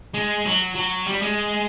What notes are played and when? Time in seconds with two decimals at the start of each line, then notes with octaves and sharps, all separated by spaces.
0.14 G#3
0.45 F#3
0.75 F#3
1.06 G3
1.22 G#3